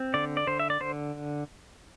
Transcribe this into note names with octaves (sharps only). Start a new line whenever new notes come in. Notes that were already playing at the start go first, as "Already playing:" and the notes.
Already playing: C4
D3 D5
D5
D3 C5
E5
D5
D3 C5